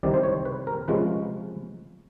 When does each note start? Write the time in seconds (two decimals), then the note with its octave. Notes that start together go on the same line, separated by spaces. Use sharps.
0.03 C2 C3 D#3 D5
0.14 C5
0.23 C#5
0.45 B4
0.67 A#4
0.88 C3 F3 G#3 C#4 B4